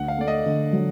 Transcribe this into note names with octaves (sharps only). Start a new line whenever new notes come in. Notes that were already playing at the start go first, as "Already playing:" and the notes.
Already playing: D2 F#5
F5
A3 D5
D#5
D3
F#3